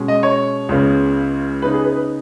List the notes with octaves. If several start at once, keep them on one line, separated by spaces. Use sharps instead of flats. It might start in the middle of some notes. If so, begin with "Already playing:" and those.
Already playing: B2 G#3 C#4
D#5
C#5
C#2 C#3 B3
C#3 B3 D#4 B4
G#4
B4
B4